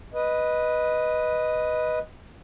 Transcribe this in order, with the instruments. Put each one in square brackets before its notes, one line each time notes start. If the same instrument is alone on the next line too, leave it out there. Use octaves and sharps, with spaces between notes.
[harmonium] B4 D#5